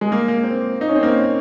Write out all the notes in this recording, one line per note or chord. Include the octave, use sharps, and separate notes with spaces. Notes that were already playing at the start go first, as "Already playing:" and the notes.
G#3
A#3
A#3
C4
D#4
C#4
C4
A#3